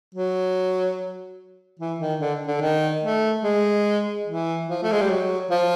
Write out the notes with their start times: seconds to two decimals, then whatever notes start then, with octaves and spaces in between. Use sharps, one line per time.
0.14 F#3
1.80 E3
2.00 D#3
2.20 D3
2.47 D3
2.61 D#3
3.03 A3
3.44 G#3
4.27 E3
4.68 F3
4.83 A3
4.92 G#3
5.01 G3
5.09 F#3
5.51 F3